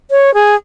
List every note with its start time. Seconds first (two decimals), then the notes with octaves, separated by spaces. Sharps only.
0.11 C#5
0.34 G#4